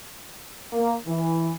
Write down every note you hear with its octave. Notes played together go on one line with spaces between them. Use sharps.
A#3
E3